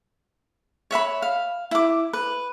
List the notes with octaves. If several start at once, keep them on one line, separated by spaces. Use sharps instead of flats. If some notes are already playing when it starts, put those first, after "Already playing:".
C#5 E5 F#5 B5
F5
E4 D6
B4